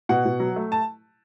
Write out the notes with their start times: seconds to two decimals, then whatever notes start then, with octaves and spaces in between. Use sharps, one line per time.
0.09 B2 F#5
0.25 B2
0.40 F#3
0.56 A3
0.72 A5